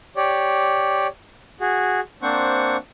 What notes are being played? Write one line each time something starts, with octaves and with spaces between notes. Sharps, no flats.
G4 C#5 D5
F#4 G#4
A#3 C4 D4 C5 F#5 C#6